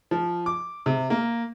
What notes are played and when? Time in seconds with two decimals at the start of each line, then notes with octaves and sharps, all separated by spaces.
0.11 F3
0.46 D6
0.86 C3
1.10 A#3